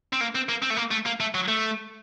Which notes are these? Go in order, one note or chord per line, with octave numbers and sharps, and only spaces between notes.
C4
A#3
C4
A#3
C4
A3
A#3
A3
A#3
A3
F#3
A3